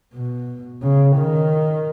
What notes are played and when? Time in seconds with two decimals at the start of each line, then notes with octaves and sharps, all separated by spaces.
0.14 B2
0.82 C#3
1.16 D#3